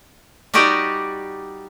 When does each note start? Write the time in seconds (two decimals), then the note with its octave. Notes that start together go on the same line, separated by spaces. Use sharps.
0.54 G3 D#4 F#4 G4 D5 D#5